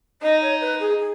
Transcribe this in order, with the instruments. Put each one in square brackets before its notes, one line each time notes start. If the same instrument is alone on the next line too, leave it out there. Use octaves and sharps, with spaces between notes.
[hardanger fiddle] D#4 [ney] D#5
[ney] C#5
B4
G#4
G#4